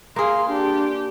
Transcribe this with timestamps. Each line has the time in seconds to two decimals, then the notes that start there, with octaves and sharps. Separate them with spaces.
0.16 A#3 G#4 F5 C6
0.49 D4 G4